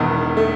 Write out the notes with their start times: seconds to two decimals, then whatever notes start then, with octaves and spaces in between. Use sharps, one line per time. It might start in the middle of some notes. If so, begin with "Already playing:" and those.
Already playing: E1 E2 D#3 B3
0.37 A3